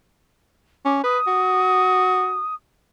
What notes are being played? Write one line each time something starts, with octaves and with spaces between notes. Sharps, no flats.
C#4 D6
B4 D#6
F#4